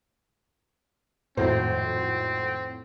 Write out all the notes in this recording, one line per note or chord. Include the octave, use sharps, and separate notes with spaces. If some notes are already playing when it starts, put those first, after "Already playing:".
G#1 F2 A2 C4 C5